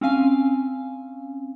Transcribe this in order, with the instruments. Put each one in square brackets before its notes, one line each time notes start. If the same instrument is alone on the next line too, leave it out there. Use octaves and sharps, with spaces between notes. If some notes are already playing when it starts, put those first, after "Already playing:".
[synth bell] C4 C#4 F5 G#5